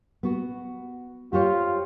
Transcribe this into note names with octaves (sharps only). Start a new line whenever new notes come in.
B3 F#4
F4 G4 C5 C#5